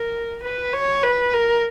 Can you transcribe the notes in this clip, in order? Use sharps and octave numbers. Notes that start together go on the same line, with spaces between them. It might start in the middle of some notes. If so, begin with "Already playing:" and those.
Already playing: A#4
B4
C#5
B4
A#4